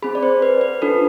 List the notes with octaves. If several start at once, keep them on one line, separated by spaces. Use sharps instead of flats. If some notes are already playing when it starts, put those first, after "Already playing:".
C4 G#4 B5
D5
C5
B4
B4
D4 F4 A4 B4